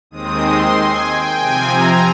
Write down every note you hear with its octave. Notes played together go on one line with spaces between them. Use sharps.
D#2 D#3 G#3 C4 D#6
C6
G#5
G5
C3 F3 C4 G#5
A#5